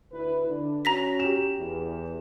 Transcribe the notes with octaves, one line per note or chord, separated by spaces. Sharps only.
D2 E4 B4
D3 D4
C#4 F#4 A#5 A#6 B6
G4 E7
E2